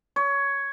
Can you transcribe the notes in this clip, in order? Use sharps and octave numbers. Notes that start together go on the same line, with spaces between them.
C#5